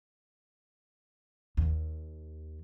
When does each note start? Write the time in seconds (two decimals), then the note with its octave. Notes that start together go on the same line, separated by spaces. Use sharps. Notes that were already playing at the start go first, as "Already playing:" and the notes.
1.57 D#2